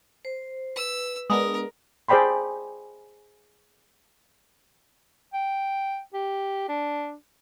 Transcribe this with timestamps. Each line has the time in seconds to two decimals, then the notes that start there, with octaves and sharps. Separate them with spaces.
0.25 C5
0.76 B4 E6
1.30 G#3 B3 D4 A#4 D#6
2.09 G#4 C5 D5 G5 B5 C6
5.33 G5
6.14 G4
6.69 D4